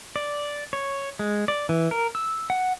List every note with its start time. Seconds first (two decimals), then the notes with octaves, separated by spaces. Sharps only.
0.16 D5
0.73 C#5
1.19 G#3
1.48 D5
1.69 E3
1.91 A#4
2.15 E6
2.50 F#5